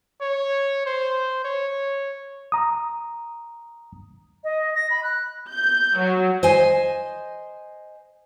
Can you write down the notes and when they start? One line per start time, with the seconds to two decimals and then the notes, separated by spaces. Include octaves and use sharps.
0.21 C#5
0.86 C5
1.45 C#5
2.52 A#5 D#6
4.44 D#5
4.74 A#6
4.90 B5
5.03 F#6
5.51 G6
5.96 F#3
6.43 C5 D#5 G#5